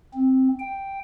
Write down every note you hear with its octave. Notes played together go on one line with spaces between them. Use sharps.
C4
G5